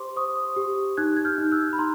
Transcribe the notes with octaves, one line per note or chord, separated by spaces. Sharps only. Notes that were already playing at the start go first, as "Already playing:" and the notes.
Already playing: G4 C5 C6 D6
C5 C#6 D#6
G4
D#4 F#6 G#6
G#6
F6 G6
D#4
E6 F#6
B5
D#4 A#5 C6